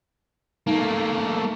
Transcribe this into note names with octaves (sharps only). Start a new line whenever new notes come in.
A3 A#3 D#4